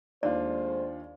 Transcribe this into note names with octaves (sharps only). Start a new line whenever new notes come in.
D#2 G#3 A3 D4 F4 C5 D5